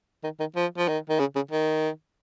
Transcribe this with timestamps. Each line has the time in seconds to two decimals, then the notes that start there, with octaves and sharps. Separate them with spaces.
0.24 D#3
0.40 D#3
0.56 F3
0.77 F3
0.88 D#3
1.10 D#3
1.19 C#3
1.36 C#3
1.51 D#3